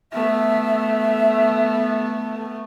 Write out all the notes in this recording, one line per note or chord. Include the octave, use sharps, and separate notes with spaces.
A3 B3 E5